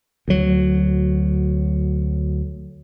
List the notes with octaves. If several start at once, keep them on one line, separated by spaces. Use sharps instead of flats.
D2 F#3